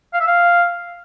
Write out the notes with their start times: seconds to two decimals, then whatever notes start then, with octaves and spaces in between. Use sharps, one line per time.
0.14 F5
0.20 E5
0.27 F5